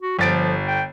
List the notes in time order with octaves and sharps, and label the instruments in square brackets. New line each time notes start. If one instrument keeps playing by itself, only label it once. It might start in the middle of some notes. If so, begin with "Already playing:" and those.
[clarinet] F#4
[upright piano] G1 A6 D7 [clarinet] F3
[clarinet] G5